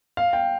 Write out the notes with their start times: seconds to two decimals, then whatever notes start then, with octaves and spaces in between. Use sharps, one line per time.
0.17 F5
0.33 G5